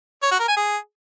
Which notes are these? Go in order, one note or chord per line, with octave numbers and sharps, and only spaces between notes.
C#5
F#4
A#4
G#5
G#4